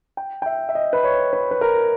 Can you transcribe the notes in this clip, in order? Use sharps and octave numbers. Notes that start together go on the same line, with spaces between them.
G5
G5
E5
E5
D#5
B4
C#5
B4
B4
A#4